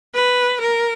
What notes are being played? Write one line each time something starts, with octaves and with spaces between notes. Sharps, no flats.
B4
A#4